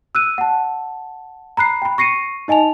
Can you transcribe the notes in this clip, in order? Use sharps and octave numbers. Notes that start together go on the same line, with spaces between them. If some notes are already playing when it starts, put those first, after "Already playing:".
E6 F#6 D#7
F#5 A5
A#5 B5 F#6 C7
G5 B5
C#6 A#6 C7 C#7 D#7
D#4 D#5 G#5 A5 F7